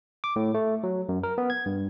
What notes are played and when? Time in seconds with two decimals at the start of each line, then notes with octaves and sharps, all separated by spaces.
0.24 D6
0.36 A2
0.54 A3
0.83 F#3
1.09 F#2
1.23 A#4
1.38 B3
1.50 G#6
1.66 G2